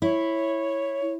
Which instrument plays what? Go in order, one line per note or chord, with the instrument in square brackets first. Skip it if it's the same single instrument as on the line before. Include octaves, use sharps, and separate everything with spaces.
[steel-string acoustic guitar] E4 [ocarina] C#5